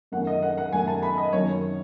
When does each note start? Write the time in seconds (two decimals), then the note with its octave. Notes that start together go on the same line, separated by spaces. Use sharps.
0.12 F#2 D#3 A3 C#4 F#5
0.27 D#5
0.42 F#5
0.58 F#5
0.73 F#2 D#3 A3 C#4 G#5
0.88 A5
1.03 B5
1.18 D#5
1.33 F#2 D#3 F#3 C#4 C#5